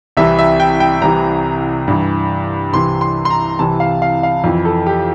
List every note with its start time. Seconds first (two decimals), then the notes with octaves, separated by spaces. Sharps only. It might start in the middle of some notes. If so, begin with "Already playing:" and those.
0.17 C2 C3 E3 E5
0.39 E5
0.60 G5
0.80 G5
1.02 C2 C3 E3 A#5
1.88 G2 E3
2.73 C2 C3 E3 C6
3.01 C6
3.25 C6
3.30 A#5
3.59 C2 C3 E3 A5
3.80 F5
4.02 F5
4.23 F5
4.44 F2 E3
4.65 A4
4.87 G4